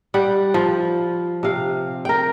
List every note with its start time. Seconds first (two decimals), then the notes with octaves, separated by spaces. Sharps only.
0.14 G3 F#5 G5
0.54 F3
1.43 C3 F5
2.05 A#4 G5